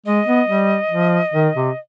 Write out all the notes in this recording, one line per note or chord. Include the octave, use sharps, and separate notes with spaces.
G#3 D#5
B3
G3
F3
D#3
C3